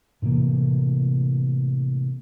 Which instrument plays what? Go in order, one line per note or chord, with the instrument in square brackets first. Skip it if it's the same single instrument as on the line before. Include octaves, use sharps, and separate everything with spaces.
[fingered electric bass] A2 C3 E3 A#3